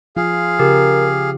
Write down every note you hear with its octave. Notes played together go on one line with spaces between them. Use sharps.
F3 F4 G#4 F5
C#3 G4 A#4